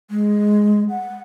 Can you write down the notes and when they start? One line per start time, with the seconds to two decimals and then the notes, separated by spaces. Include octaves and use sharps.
0.11 G#3
0.90 F#5